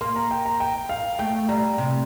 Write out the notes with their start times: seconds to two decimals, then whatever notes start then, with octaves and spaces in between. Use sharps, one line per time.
0.01 A#3 C6
0.16 A#5
0.31 G5
0.46 A#5
0.60 G5
0.89 F5
1.19 A3 G5
1.48 G3 A#5
1.78 C3